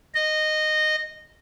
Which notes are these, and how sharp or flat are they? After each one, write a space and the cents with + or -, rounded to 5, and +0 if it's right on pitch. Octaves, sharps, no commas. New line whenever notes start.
D#5 -15